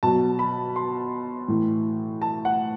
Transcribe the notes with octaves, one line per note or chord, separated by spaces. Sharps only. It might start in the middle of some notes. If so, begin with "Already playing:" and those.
B2 F#3 A5
B5
C6
A2 E3
A5
F#5